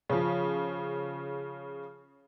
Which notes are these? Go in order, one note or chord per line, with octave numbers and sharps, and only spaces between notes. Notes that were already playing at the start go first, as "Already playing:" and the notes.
C#3 F3